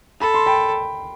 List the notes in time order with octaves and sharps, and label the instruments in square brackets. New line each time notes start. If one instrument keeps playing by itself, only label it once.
[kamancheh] A4 [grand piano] B5
[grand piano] C6
G5 B5